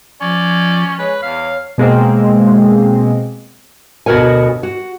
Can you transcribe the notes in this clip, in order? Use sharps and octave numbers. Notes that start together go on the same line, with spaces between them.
F3 C#4 D5
G#3 B4 C#5
E2 F5
B2 G#3 A#3 C4
D2 B2 F#4 A#4 C#5 G#5
F#4